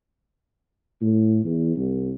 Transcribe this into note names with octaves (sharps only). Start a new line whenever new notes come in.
A2
E2
C2